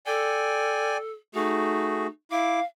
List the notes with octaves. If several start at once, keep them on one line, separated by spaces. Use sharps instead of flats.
A4 D5 G5 G#5
A3 D#4 F#4 G#4
E4 F5 D6